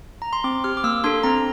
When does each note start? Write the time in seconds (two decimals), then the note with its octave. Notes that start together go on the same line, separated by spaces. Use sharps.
0.22 A#5
0.33 C6
0.44 C4 D6
0.64 G4 F6
0.77 D6
0.84 A#3 E6
1.04 D4 A4 C6
1.23 C4 A#5